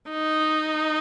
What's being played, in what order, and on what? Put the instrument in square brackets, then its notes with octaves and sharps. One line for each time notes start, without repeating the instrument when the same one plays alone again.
[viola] D#4